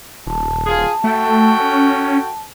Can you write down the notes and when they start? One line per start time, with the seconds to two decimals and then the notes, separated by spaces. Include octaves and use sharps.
0.27 D#1 A5
0.66 F4 G#4
1.04 A3 F#4 A4 G5
1.60 C#4